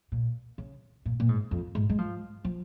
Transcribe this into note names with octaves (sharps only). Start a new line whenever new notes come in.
A#2
C#3
A#2
A#2
G#2
F2
G#2
G#3
F3
F3